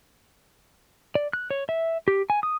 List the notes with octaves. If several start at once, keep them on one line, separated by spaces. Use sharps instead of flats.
D5
F#6
C#5
E5
G4
G#5
D#6